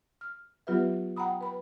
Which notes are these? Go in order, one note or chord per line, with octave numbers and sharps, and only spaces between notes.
F6
F#3 B3 F4 G4 B4 E5
F#5 G5 A#5 B5 D#6
B4 B5